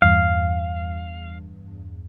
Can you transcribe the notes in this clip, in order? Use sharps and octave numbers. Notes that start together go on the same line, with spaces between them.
E2 G2 F5